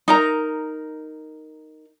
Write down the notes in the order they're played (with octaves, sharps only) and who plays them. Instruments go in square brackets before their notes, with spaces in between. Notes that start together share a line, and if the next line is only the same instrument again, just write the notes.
[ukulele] D#4 A#4 A#5